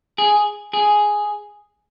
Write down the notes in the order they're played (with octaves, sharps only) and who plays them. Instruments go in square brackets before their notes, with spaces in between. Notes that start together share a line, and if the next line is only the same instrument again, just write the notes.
[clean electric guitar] G#4
G#4